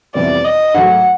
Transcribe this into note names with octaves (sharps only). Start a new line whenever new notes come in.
F2 C3 E3 G3 B3 D5
D#5
G#2 D#3 F#3 A3 F#5